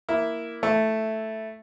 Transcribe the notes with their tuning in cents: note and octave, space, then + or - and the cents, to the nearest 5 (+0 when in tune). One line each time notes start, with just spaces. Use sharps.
A#3 +0 E4 +0
A3 +0 E4 -5